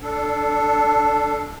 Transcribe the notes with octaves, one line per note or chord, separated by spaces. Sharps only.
D4 A4